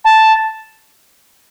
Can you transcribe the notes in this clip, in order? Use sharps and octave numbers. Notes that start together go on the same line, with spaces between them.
A5